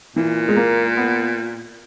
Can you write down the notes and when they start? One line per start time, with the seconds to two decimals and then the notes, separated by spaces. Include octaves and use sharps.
0.16 A#2 E3
0.48 G#3
0.56 A#3
0.97 B3